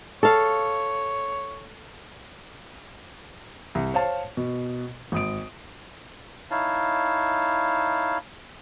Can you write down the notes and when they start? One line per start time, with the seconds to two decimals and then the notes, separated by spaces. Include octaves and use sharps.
0.23 A4 C#5 F5
3.75 C2
3.94 C5 C#5 F5 A5
4.37 B2
5.12 G#1 D#6 D7
6.51 D#4 E4 C#5 F5 A5